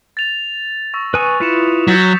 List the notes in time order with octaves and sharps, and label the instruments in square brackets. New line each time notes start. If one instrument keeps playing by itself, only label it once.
[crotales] A6 F7
C#6 E6 A#6
[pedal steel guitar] B4 G#5 C#6 [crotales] D#6
[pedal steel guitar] E4 F4 B4 [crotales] B6 C#7 E7
[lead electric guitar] F#3 [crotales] G6 A6 B6